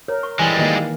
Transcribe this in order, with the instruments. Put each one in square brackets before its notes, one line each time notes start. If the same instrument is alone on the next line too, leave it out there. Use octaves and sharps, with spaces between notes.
[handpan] A#4 [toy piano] C#5
[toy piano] C#6
[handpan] E3 [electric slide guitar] G3 G#3 [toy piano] G#5
[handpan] D#3 A#3 [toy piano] F4 D#5 G5